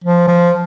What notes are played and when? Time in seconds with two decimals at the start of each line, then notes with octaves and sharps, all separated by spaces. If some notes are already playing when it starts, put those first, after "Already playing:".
0.04 F3
0.28 F3